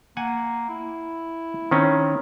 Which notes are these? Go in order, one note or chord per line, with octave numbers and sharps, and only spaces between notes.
A#3 F#5 G#5
E4
D#3 C4 C#4